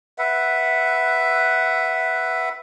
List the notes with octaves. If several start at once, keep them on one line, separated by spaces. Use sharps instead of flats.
B4 E5 F#5